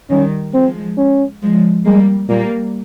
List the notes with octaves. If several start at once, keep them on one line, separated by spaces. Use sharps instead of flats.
D#3 G3 C#4
F3 G#3 C4
C#4
F3 G#3
G3 G#3 A#3
A#2 G3 A#3